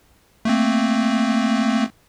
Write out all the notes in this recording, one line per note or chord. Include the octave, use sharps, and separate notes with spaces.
A3 A#3 C4